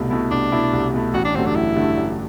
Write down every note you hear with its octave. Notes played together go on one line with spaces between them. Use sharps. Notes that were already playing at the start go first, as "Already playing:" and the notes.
Already playing: C2 B2 A3 E4
B2 A3 E4
C2 D4
B2 A3 E4
C2
B2 A3 E4
A1 F#4
D4
G2 D3 F#3 A3 C4
D4
A1 E4
G2 D3 F#3 A3
A1